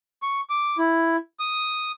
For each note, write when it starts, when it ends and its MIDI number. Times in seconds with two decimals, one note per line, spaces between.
0.23 0.41 85
0.50 0.77 86
0.78 1.16 64
1.40 1.91 87